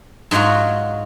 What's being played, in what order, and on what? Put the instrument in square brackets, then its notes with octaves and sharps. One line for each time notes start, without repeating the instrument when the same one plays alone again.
[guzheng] G#2 F#3 G#3 F4 F#4